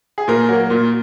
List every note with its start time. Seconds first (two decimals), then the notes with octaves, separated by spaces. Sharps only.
0.18 G#4
0.28 A#2 A#4
0.49 F#3 A#3
0.70 A#2